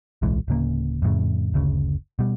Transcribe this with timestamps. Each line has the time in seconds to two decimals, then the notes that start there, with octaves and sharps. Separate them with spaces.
0.22 D1 B1 E3 G#3
0.48 D1 C#3 A#3
1.02 F2 A2 C#3
1.54 F#1 D2 C#3
2.19 B2 G3